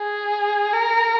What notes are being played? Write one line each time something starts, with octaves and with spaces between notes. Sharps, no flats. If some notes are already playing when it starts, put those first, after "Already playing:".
Already playing: G#4
A#4